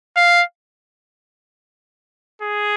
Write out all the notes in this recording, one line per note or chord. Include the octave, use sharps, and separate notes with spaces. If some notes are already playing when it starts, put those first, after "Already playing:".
F5
G#4